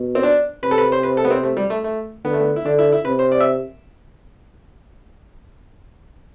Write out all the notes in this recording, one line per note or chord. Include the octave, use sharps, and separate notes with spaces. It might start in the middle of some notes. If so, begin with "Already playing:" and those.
Already playing: B2
C4
D4
C3 B4
A4
B4
C5
B4
A4
B3
C4
A3
G3
A3
A3
D3 B3
A3
B3
E4
D3 D4
E4
E4
C3 B4
C5
D5
E5